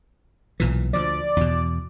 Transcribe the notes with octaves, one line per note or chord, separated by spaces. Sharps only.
B1 A#2 E3
D2 F3 D5
E2 B2